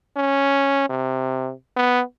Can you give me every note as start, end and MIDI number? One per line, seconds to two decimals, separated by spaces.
0.17 0.86 61
0.90 1.51 48
1.76 2.01 59